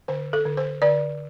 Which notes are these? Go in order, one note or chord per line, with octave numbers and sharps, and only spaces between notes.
D3 C5
A4
D3
C5
D3 D5